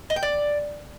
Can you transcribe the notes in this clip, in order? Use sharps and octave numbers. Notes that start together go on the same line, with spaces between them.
D#5
G5
D5